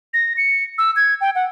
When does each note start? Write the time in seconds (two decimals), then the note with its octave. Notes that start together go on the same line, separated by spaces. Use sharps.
0.14 A#6
0.37 C#7
0.78 E6
0.96 G#6
1.21 G5
1.35 F#5